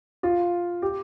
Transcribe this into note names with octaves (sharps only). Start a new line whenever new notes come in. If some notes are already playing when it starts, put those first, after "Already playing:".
F4
G4